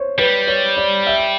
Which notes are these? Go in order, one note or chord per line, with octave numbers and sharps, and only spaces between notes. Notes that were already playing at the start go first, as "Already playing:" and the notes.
Already playing: C5 C#5
G3 B4
C#5
D5
E5